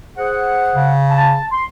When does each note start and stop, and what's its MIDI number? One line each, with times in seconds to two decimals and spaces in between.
0.17 0.94 68
0.17 0.94 72
0.17 0.94 78
0.75 1.38 49
1.10 1.46 81
1.52 1.65 84